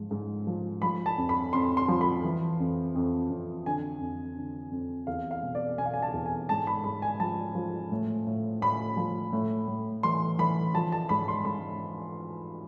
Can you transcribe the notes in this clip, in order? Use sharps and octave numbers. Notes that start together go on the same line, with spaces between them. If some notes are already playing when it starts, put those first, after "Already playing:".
Already playing: G#2 F3
G#2
F3
F3 B5
A5
F2
B5
F2 C6
C6
F3
B5
E3
F2
F2
F2
D3 G#5
F2
D3
F2
E2 F5
F5
B2
D5
B2 G#5
F5
G#5
A5
E2
G#5
G#2 A5
B5
G#2 B5
G#5
F3 A5
F3
A2
A2
A2 B5
F3
A2
A2
E3 C6
E3 B5
F3 A5
A5
G#2 B5
C6
G#2 B5